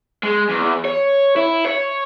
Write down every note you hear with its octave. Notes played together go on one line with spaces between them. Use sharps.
G#3
E2
C#5
E4
C#5